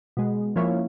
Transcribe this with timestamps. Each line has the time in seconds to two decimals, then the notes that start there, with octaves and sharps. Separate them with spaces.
0.17 B2 G#3
0.56 F3 A#3 C#4 E4 F4 C#5